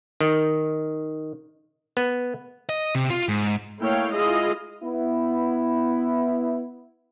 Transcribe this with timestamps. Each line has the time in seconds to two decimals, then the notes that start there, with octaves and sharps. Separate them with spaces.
0.20 D#3
1.97 B3
2.69 D#5
2.95 C3
3.10 F4
3.29 G#2
3.80 A3 A#3 E4 C#5 F5 G5
4.13 G#3 E4 F4 G#4 D#5 F5
4.84 B3 E4